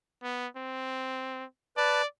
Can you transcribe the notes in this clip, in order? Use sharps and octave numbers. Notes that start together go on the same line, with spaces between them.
B3
C4
B4 D5 A5